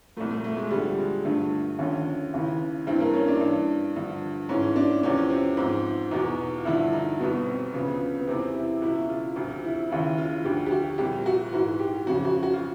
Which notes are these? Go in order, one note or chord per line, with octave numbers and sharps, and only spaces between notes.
C2 A#2 F3 A3
A3
A3
G#3
D2 D3 F3 G3
G#3
G2 D3 F3 A3
D#2 D3 F3 C#4
D#2 C#3 E3
G2 E3 C4
A#3
C#4
D4
G2 E3
G2 D3 F3
G#2 E3 C#4
D4
E2 C3 F3 C#4
C4
G#2 F3 C4
E2 B2 D#4
F4
G2 D3 F3 E4
D#4
C2 B2 B3
C4
D2 C#3 F3 B3
B3
E2 C3 E3 C4
E4
C#2 B2 E4
F4
D2 C3 F3 F4
E4
D#2 C#3 E3 E4
F4
D2 D3 F3 G4
G4
F#4
C2 A#2 F3 G4
F#4
G#2 E3 F#4
G4
F2 C#3 F3 F#4
F#4
F#4
F4